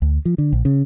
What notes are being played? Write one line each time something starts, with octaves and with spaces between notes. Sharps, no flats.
D2
F3
D3
A#1
C#3